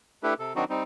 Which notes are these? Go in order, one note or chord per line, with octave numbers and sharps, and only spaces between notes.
A3 D4 E4 G4 A4 B4
C3 A4
D#3 F#3 C4 D4 D#4 F#4
G3 C4 D#4